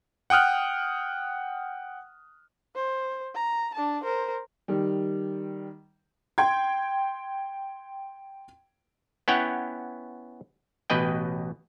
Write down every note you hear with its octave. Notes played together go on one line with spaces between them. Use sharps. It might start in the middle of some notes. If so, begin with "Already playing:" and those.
F#5 G5 D#6 F6 F#6
C5
A#5
D4 A5
A#4 C5
D#3 G3
G5 C6 G#6
B3 C#4 E4 C#5 F#5 G5
A1 B2 B4 D#5 G5